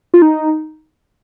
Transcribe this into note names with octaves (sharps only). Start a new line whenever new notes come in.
F4
D#4